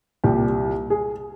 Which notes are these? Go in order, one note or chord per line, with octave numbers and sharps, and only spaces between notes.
C2 A#2 G3 G4
G#4